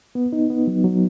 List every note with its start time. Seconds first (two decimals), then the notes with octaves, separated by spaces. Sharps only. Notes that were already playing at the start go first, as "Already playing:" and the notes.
0.15 B3
0.33 D#4
0.50 B3
0.67 F#3
0.84 F#3